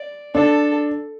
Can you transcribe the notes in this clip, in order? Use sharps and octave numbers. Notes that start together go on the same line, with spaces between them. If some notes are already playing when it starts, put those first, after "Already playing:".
Already playing: D5
D4 A4